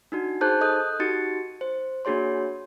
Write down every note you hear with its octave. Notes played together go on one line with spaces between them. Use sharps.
D4 D#4 F#4
D#4 G#4 C5 A5 F#6 G6
A4 D#5 D#6 F#6 G6
D#4 F#4 G4 A6 C#7
C5
A#3 D4 F#4 G#4 C#5 C6